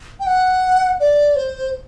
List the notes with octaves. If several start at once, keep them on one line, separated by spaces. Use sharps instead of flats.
G5
F#5
D5
C5